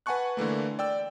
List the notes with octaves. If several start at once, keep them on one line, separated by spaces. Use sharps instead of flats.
B4 F#5 G#5 A5 C#6 F#6
D3 E3 A3 A#3
D5 G5 E6